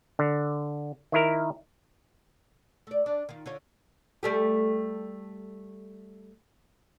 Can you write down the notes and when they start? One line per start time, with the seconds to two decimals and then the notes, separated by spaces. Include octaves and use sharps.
0.19 D3
1.12 D#3 E4 A#4
2.87 A3 D5
3.06 D4
3.29 D#3 F4
3.46 D3 F4 C#5
4.23 G3 A3 G4